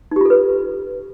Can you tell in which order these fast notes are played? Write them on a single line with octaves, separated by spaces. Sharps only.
D#4 G4 F4 A4 B4